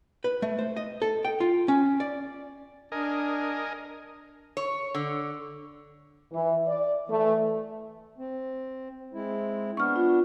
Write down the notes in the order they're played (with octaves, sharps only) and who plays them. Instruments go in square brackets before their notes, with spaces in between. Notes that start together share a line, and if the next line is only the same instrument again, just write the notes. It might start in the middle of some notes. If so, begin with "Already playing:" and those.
[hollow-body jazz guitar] B4
A3
C5
D#5
A4
G5
F4
C#4
D5
[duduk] D4 [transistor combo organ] A#4 D#5 G#5
[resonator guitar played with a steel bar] C#5
D3
[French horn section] E3
D5
E3 A3
[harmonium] C4
G#3 C4 E4
[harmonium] B3 D4 [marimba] C#6 F6
[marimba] F4